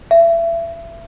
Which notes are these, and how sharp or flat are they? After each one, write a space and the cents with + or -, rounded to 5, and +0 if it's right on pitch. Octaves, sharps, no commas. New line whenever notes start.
E5 +30